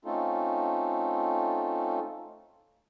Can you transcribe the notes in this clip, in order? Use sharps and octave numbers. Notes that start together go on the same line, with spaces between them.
A3 C4 C#4 D#4 F4 A4